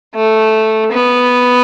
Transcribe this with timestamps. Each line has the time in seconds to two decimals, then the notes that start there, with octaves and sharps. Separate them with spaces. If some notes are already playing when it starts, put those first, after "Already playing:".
0.15 A3
0.92 B3